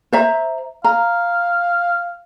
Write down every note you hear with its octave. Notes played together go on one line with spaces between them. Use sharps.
C5 E5 A#5
F5 A#5